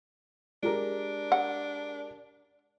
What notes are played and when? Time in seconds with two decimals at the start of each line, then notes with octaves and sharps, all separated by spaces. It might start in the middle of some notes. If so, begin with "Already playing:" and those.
0.63 G#3 D4 G4 A#4
1.32 F#5